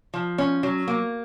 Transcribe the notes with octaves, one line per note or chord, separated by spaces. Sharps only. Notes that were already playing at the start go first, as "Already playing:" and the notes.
F3
C#4
F#3
A#3